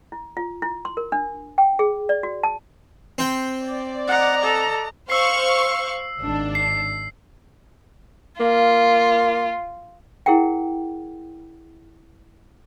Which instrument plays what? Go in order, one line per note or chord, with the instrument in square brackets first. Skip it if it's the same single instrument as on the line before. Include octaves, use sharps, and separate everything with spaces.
[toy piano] E4
F4
E4
C6
A#4
D4
G5
G#4
D5
F#4
A5
[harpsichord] C4 G5
[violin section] D5
[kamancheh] D#5 A#5 [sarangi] F#5
[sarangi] A4
[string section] C5 F5 C#6 [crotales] E6 C7
[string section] G#1 D4
[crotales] C7
[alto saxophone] A#3 [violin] F4
[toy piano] E4 G#4 A#4 F#5 G5